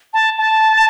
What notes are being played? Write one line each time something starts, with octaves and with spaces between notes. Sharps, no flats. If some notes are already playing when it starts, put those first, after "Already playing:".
A5
A5